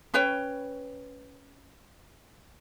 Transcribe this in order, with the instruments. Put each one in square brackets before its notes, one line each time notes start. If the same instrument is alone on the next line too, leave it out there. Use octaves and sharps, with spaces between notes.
[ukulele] C#4 B4 C#5 G5